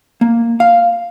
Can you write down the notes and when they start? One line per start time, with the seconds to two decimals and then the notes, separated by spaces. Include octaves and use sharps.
0.21 A#3
0.60 F5